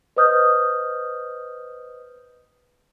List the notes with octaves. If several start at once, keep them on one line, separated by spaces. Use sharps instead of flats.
B4 C5 D#5 D#6 F6 G6